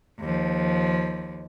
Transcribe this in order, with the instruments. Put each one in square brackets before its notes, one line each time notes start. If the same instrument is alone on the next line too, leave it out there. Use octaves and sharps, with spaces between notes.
[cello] D#2 F3